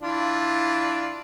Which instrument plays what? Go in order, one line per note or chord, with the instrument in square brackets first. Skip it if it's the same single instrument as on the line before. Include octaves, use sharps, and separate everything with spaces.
[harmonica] E3 D4 F4